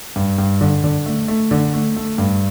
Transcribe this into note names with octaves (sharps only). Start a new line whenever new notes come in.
G2
G2
D3
D3
A3
A3
D3
A3
A3
G2